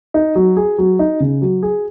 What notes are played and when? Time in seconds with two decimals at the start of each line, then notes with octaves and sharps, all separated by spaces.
0.14 D#4
0.35 F#3
0.57 G#4
0.78 F#3
0.99 D#4
1.20 C#3
1.42 F#3
1.63 G#4